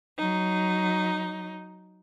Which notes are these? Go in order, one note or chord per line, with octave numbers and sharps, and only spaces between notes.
F#3 D#4